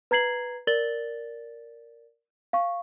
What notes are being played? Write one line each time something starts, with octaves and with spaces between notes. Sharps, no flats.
B4 A#5 G#6 C7 F#7
A#4 D5 A6 F#7 G7
F5 C#6